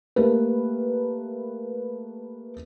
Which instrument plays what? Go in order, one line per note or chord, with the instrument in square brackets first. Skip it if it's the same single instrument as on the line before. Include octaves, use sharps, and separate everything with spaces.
[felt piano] A3 A#3 G4 A#4 B4